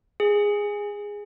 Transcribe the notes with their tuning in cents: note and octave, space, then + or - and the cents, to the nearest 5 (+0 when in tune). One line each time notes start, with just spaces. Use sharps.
G#4 -10